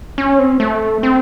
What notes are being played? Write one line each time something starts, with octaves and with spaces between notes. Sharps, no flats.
C#4
C4
A3
C4